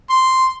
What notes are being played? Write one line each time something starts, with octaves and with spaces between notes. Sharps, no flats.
C6